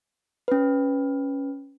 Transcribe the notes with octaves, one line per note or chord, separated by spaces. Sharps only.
C#4 B4